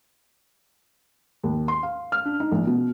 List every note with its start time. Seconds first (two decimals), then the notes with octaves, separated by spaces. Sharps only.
1.44 D#2
1.68 C6
1.83 F5
2.12 F6
2.25 D4
2.40 D#4
2.52 A#1
2.67 B2